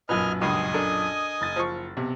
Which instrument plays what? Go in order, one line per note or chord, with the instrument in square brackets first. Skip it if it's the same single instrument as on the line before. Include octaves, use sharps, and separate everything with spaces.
[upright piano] B1 F#2 A#2 [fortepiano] B4 [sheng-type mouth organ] D#5 G#5 F6
[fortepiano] C#2 G2 [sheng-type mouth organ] D#5 G#5 D#6
[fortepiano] D4 A4 A#4
[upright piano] F#1 A6
[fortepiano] F3 C#6
[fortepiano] B1 [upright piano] C3